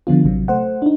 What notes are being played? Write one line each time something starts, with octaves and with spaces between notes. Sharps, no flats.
D3 F3 B3 F4
A1 C3 F#3
A3 C5 F#5
D4 D#4